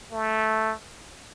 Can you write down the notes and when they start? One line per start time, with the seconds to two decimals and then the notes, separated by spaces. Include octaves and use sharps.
0.12 A3